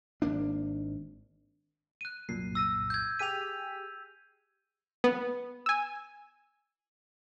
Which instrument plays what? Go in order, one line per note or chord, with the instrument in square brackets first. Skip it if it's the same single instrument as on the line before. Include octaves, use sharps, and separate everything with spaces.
[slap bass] G#1 A#3 D4
[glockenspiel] F#6 D#7
[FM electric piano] C2 F#2 A#2 [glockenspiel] C7
[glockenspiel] E6 A#6 D#7
G6 G#6
[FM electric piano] G4 G#4 B6 [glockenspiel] D#7 F7
[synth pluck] B3
G#5 E6